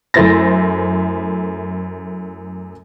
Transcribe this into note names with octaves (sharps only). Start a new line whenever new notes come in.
F#2 A3 E4 C5 A6 A#6